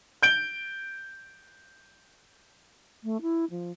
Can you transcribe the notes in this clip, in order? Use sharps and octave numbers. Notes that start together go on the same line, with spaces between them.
G6 D7 G7
A3
E4
F3